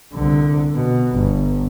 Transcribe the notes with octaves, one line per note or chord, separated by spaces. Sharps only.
C2 D3
B2
G1